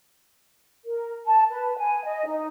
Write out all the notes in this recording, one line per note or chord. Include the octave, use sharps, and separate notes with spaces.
A#4
A5
B4
G#5
D#5
D#4